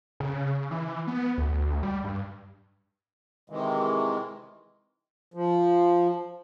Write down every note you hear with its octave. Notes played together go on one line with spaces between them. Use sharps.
C#3
E3
B3
D2
G3
G2
C3 D#3 E3 G#3
F3